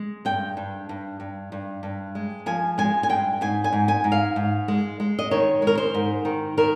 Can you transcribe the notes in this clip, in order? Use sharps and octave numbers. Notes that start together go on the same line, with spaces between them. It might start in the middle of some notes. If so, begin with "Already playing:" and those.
Already playing: G#3
G2 G5
G2
G2
G2
G2
G2
G#3
F3 G#5
G#3 G#5
G#5
G2 G5
G#2 G#5
G#5
G#2
G#5
G#2
F5
G#2
G#3
G#3
D#5
D#3 C#5
G#3 A#4
C5
G#2
D#3
D#3 A#4